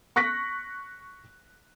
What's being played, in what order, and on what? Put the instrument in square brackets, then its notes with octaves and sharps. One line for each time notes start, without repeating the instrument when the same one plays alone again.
[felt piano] C#6 F#6 A#6 B6